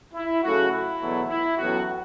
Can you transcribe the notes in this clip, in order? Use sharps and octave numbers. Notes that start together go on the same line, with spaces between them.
E4
F#2 C#3 A3 F#4
E4
E2 B2 F#3 A3
E4
A1 A2 F#3 B3 F#4